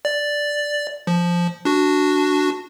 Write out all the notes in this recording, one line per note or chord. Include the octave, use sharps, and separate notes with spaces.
D5
F3
D4 F#4